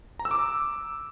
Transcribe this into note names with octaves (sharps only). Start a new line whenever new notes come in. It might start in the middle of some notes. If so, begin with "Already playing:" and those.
A#5
E6
D6